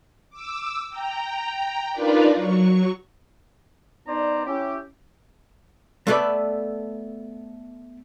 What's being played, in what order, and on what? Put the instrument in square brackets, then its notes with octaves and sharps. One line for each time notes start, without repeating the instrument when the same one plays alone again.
[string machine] D6 E6
G5 A#5
D4 D#4 F4 A#4 B4 D5
F#3 C#6
[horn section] B3 D4 D#4 C5 D5 A#5
C#4 E4 G4
[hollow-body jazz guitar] A3 B3 A4 B4 D5